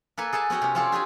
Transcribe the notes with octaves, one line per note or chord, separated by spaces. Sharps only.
A#3 A4 B4 G#5
G#4 A4 G#5 A5
B3 C#4 F#4 F#5 G5
C3 C#4
C4 C#4 F4 G#4 A4 D5
D4 G4 G#4 G#5